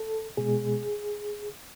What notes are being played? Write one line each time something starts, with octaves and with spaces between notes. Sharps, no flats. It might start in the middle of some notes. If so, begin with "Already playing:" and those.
Already playing: A4
B2 G#3 G#4